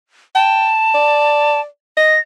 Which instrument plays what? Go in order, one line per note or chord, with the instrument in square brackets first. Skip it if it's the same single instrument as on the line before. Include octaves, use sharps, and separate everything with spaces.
[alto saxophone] G5 [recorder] A5
[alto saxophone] D5
[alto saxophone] D#5 [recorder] A#6